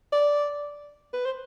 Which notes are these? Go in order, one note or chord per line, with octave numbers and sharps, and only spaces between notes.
D5
B4
C5